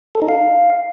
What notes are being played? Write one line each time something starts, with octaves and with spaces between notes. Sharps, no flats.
A4
D#4
F5